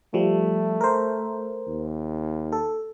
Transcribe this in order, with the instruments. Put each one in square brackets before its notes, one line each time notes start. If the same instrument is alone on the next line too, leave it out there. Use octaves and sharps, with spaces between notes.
[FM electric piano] F3 G3 [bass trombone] A3
[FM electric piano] A#4 C5
[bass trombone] D#2
[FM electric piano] A4